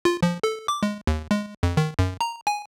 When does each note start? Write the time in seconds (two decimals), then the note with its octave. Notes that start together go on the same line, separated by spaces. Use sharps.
0.05 F4
0.23 F3
0.43 A4
0.68 D6
0.83 G#3
1.07 D#2
1.31 G#3
1.63 F2
1.77 D#3
1.99 F#2
2.21 A#5
2.47 G#5